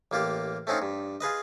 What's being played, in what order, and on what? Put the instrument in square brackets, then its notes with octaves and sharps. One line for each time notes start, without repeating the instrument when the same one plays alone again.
[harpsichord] A1 A#3 F4 G4
A3 C4 C#4 D#4 F4
G2
F4 G#4 B4 D#5